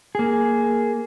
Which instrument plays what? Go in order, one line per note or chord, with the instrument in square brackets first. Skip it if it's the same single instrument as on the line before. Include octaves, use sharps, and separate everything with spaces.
[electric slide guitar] A#3 G#4